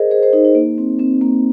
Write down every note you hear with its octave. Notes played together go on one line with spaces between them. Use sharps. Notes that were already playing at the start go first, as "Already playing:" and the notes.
Already playing: G#4 A#4 C5 D#5
G#4 C5
G#4 C5
D#4 G#4
D#4
A#3
C4
C4
A#3